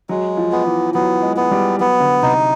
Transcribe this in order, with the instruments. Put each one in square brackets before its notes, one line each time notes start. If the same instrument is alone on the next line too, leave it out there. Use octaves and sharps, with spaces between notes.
[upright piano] F#3 [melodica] G#3
[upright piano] F3
[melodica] B3
[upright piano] E3
[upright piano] F#3 [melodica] B3
[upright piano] G#3
[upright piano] G#3 [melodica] B3
[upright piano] G3
[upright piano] F#3 [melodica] B3
[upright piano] D3
[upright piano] C3 [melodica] D#4